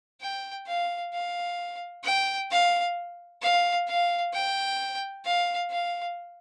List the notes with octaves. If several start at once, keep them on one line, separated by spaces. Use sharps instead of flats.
G5
F5
F5
G5
F5
F5
F5
G5
F5
F5